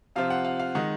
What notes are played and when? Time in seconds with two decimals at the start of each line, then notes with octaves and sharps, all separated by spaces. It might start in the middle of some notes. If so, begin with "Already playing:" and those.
0.16 C3 F3 C4 F4 F5
0.30 F#5
0.45 F5
0.60 F5
0.75 D#3 G#3 D#4 F#5